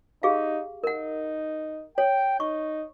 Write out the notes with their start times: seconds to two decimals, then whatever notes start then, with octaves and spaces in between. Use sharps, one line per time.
0.23 D#4 G4 G#4 F5
0.84 D#4 A#4 F#5
1.98 C#5 G5
2.40 D#4 C#6